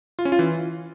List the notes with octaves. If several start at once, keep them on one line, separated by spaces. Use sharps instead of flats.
F4
C#4
F4
E3